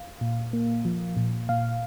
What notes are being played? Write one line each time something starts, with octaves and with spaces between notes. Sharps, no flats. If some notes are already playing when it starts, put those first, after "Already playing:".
Already playing: F5
A#2
A#3
F3
A#2
A#2 F5